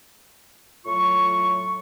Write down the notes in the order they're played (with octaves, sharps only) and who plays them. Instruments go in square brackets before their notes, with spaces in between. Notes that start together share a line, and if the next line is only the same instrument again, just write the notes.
[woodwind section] A2 F#3 F4 C#6